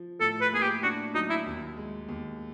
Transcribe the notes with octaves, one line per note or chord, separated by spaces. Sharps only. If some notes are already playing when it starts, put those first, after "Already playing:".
Already playing: F3
A2 A4
B4
A#3 G#4
G4
D4 F#4
F#3 D#4
E4
D#2
G#3
D#2